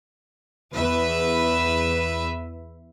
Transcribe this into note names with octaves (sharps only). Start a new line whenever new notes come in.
E2 B4 E5